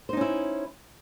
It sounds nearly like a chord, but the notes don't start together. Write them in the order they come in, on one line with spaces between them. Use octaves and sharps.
C5 D#4 C#4 E4